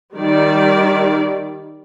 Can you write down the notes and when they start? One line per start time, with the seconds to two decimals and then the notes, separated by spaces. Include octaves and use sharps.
0.15 D#3 G3 D5